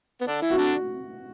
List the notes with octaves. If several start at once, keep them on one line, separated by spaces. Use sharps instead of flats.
B3
D3 D4
E3 E4
F#4
D3 D4